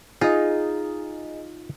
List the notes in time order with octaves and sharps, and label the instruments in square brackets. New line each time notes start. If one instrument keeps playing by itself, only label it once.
[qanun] D#4 [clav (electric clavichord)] F4 [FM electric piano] G#4 D#5